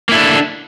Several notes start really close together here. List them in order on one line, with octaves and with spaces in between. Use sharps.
A#3 E4 A4 D4